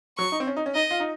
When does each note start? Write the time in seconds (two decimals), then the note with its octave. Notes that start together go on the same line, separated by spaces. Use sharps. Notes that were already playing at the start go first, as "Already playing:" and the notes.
0.18 F#3 C#6
0.32 D#4
0.40 C4
0.47 C#4
0.57 D#4
0.66 C#4
0.75 D#4 D#5
0.91 F4
1.00 D#4